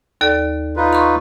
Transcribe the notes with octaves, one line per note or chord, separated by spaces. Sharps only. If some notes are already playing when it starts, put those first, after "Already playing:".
D#2 A4 D5
D#4 F4 B4
C6 C#6